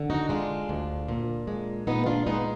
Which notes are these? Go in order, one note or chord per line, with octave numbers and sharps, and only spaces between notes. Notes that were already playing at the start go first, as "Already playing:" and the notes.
Already playing: D3
D#4 F#4
G#3 D4 F4
D2
A#2
G#3
A#2 B3 D#4
D4 F4
G#3 B3 D#4